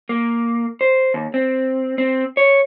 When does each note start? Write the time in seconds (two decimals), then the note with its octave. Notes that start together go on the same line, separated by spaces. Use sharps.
0.09 A#3
0.81 C5
1.14 D#2
1.34 C4
1.98 C4
2.37 C#5